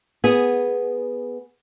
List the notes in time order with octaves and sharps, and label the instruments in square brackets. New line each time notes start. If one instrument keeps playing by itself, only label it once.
[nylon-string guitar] B3 G#4